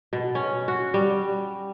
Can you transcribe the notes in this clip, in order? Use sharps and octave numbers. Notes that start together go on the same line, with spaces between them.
B2
C#4
F#4
G3